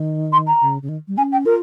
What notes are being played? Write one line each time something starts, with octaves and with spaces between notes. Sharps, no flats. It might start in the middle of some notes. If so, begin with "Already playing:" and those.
Already playing: D#3
C6
A#5
C#3
C#3
D#3
G3
C#4 G#5
G5
F4 A#4